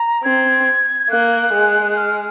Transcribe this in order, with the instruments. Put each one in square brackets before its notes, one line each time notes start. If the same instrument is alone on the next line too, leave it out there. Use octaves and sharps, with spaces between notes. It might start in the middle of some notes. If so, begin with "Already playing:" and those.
Already playing: [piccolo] A#5
[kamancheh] C4 [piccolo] G#6
[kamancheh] A#3 [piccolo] F#6
[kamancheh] G#3
[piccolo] F6